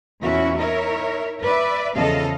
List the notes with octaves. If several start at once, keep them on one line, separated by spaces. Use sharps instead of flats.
E2 A#2 C#4 E4 F#4 E5
D#4 E4 A#4 C#5 E5
B4 D5 E5
E2 C#3 F3 A4 D#5 F5